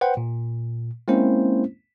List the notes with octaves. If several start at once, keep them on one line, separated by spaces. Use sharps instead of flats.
B4 C5 F#5 G5
A#2
G#3 A#3 C4 C#4 E4 C5